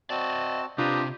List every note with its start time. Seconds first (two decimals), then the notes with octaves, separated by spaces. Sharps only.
0.10 C4 F#4 D5 D#5 A5
0.78 C3 C4 D4 F4 G4 B4 A#5 D#6